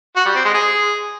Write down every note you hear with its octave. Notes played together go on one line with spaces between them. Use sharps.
F#4
G3
C4
G#3
G#4